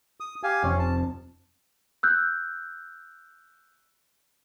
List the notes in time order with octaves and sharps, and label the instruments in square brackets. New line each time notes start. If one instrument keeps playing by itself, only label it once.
[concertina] D#6
G4 F5 G#5
[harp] F1 F2 C5 [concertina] C#4
[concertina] A5
[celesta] E6 F#6 G6